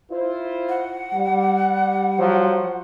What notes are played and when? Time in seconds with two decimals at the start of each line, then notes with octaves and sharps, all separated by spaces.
0.12 E4 F4 C5
0.69 F#5
1.14 G3
2.18 F3 F#3 C5